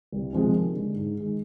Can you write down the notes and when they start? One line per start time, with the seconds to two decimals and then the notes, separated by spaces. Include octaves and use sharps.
0.12 C2
0.33 C3 F3 G#3 C4
0.54 D#2
0.75 D3 G#3
0.96 G#2
1.16 D#3 G#3